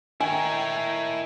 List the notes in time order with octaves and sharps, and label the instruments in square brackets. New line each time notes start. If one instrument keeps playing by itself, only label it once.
[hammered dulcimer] D#3 [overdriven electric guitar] E4 C#5 [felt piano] G#5